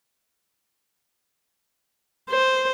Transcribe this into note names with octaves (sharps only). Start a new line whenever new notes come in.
C5